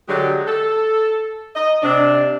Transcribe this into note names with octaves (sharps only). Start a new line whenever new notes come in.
D3 F#3 G#3 G4
A4
D#5
C3 D4